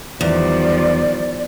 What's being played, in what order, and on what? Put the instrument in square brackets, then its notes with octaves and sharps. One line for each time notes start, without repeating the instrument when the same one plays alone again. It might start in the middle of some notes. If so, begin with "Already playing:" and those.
[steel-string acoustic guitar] E2 [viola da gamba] D#3 F3 G3 [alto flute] D5